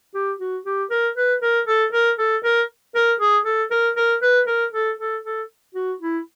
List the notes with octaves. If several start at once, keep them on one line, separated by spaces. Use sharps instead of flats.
G4
F#4
G4
A#4
B4
A#4
A4
A#4
A4
A#4
A#4
G#4
A4
A#4
A#4
B4
A#4
A4
A4
A4
F#4
E4